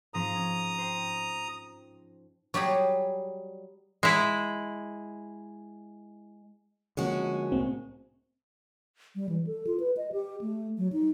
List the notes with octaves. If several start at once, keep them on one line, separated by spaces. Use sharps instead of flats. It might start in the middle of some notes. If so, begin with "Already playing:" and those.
G#2 F3 C4 A#5 D#6
C#4
C5 G5
F#3 G3 G4 G#4
G#3 E4
D3 F3 G#3 A#3 C#4 F#4
C2 A2 A#3 C4
G3
E3
A4
F4
B4
D#5
G4
A3
F#3
D#4